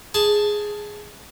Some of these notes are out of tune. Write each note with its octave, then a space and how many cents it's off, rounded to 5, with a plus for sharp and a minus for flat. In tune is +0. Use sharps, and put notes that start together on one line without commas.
G#4 +0 A5 +0